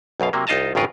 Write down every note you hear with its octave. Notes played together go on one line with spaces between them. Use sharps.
B1 F#2 B2 F5
C3 F#3 A#3
C2 D#4 F4 D#5 A5 A#5
G#1 G2 C#3 F4 A#4 B4